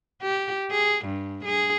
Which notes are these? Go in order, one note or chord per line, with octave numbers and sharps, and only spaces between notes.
G4
G#4
G2
G#4